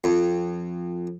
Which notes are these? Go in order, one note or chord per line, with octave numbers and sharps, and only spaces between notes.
F2